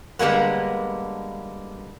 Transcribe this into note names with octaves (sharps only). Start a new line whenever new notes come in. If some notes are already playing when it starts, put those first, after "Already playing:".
D3 G3 G#3 A#3 B3